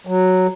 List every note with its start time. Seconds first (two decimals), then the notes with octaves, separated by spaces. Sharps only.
0.07 F#3